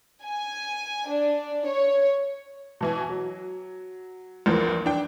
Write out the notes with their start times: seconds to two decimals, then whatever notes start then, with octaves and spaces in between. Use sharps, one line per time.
0.22 G#5
1.08 D4
1.67 C#5
2.81 B2 E3 G#5
3.09 F#3
4.46 A#1 E2 F3 A#3
4.86 D4 G5